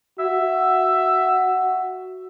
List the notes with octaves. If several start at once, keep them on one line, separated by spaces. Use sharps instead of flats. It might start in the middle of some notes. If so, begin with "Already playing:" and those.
F#4 E5